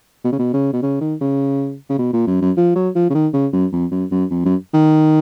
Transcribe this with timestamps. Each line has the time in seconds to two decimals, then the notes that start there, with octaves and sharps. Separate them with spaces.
0.24 B2
0.32 C#3
0.39 B2
0.53 C#3
0.73 B2
0.82 C#3
1.01 D#3
1.21 C#3
1.89 C#3
1.98 B2
2.13 A#2
2.27 F#2
2.42 F#2
2.57 F3
2.76 F#3
2.95 F3
3.10 C#3
3.14 D#3
3.33 C#3
3.53 F#2
3.72 F2
3.91 F#2
4.11 F#2
4.30 F2
4.45 F#2
4.74 D#3